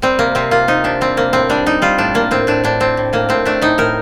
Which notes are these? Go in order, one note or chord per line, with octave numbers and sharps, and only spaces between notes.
G3 C4
C3 A#3
C3 C4
A#3 F4
C3 D#4
C3 D4
G3 C4
C3 A#3
A2 C4
G3 D4
G3 D#4
G3 F4
A2 D4
A2 A#3
A2 C4
A2 D4
A2 D4
A2 C4
A2
A2 A#3
A2 C4
A3 D4
A2 D#4
A2 A#4